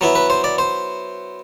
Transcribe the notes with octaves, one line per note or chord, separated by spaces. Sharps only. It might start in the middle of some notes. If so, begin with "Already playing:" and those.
F#3 B3 E4
B4
C5
D5
C5